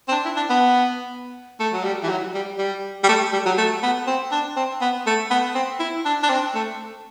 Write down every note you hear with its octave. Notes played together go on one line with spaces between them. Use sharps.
C4
D4
E4
D4
B3
A3
F#3
G3
E3
F#3
G3
G3
G3
A3
G3
F#3
A3
B3
C4
D4
C4
B3
A3
B3
C4
E4
D4
D4
C4
A3